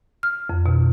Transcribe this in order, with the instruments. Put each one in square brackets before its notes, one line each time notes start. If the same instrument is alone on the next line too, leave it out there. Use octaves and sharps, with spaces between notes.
[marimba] F6
F2
B2